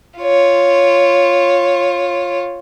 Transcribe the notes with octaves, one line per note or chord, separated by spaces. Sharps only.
F4 C#5